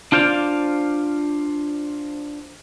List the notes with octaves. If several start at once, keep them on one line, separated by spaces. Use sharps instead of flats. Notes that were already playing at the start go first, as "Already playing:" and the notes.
D4 F4 C5 D5 F5